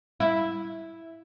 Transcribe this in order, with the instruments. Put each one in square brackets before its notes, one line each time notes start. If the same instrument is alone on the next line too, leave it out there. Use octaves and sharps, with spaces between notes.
[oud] E4